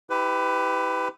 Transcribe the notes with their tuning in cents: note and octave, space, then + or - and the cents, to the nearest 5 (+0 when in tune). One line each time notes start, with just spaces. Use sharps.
E4 -30 G4 +0 B4 +25